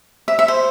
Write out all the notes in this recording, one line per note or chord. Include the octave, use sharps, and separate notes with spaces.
E5
E5
C5